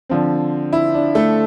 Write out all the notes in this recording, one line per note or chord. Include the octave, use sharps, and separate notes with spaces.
D3 F3 C4
E4
D4
A3 A4